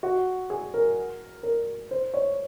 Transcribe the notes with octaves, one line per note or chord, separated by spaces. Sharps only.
F#4
G#4
A#4
A#4
C5
C#5